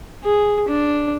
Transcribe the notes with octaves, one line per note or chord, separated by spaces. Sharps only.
G#4
D4